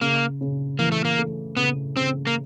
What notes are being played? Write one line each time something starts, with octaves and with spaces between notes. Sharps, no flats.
C#3 A#3
C#3
E3 A#3
A3
A#3
A3
C#3 B3
C#3 C4
A#3